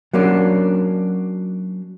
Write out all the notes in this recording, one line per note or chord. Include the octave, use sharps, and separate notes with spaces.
F#3 A#3 C#4 D4